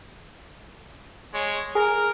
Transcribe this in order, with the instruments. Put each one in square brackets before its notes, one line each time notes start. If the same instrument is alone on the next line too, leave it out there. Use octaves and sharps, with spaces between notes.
[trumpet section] G#3 C#5
[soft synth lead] G#4 [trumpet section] A#4